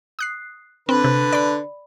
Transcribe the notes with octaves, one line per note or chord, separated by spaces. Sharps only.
D#6 F#6 C7
D3 C4 B4
C3
D5 B5